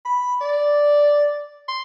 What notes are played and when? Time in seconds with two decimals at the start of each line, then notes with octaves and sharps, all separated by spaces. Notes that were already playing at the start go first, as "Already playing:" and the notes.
0.05 B5
0.41 D5
1.68 C6